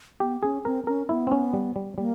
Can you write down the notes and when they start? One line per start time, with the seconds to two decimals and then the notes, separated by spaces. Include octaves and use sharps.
0.20 B3 G4
0.43 C#4 G#4
0.64 C4 A#4
0.87 C#4 A#4
1.09 B3 E4
1.27 C4
1.32 C#4
1.53 G3
1.76 G3
1.98 G3 A#3